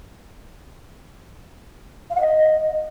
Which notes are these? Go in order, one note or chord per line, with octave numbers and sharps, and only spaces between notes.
F5
F#5
D#5